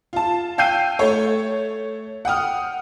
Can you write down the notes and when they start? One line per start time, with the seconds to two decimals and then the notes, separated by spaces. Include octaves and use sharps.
0.13 F4 A5
0.58 F5 G5 E6 G6 C7 D#7
0.99 A3 C#5
2.25 F#5 G5 D#6 F6